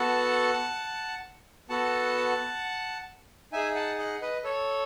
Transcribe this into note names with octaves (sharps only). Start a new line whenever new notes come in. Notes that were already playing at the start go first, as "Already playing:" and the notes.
Already playing: B3 F#4 A4 F#5 A5
B3 F#4 A4 F#5 A5
D#4 G#4 E5 G#5
F#5 A5
D#5 F#5
B4 D#5
A4 C#5